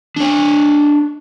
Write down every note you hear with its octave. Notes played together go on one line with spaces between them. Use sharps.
D4 C#5